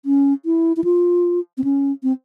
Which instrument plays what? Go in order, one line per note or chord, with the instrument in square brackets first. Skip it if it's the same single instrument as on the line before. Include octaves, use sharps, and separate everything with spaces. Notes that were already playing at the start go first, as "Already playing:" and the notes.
[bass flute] C#4
E4
E4
F4
C4
C#4
C4